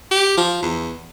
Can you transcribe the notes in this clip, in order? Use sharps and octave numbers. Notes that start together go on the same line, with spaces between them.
G4
F3
E2